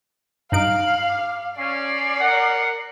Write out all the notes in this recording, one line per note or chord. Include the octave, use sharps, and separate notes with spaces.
G2 D#4 F5 D7 F#7
D6
C#4 D5 C7
A#4 F#5